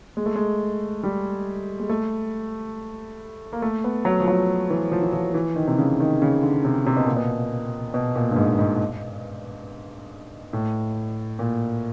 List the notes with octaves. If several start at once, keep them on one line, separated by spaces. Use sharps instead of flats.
G#3
A3
G#3
G3
G#3
A3
A#3
A3
B3
F#3
F3
F#3
E3
F3
E3
F3
E3
D#3
C3
C#3
D#3
C#3
D3
C3
C3
B2
A#2
B2
B2
A#2
G2
G#2
G#2
A2
A#2